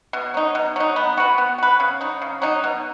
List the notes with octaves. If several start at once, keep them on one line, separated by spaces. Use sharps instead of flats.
B2
F#3 D#4
B2
F#3 D#4
B3
F#4 B4
B3
F#4 B4
C#3
F#3 D#4
C#3
F#3 D#4
B2